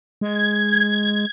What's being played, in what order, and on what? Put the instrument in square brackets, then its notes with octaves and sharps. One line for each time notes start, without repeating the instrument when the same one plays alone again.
[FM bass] G#3 [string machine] G#6